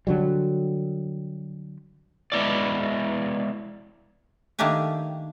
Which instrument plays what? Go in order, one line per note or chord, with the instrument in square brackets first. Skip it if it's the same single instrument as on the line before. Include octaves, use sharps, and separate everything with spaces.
[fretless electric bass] D3 F#3 G3
[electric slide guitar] G#3 B3 E4 D5
[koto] D#3 A3 A#3 D4 G4 G#5